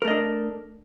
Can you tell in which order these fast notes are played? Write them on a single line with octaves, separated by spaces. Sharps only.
A#4 A3 D#5 D4